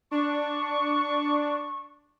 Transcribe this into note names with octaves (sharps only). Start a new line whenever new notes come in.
D4 C#6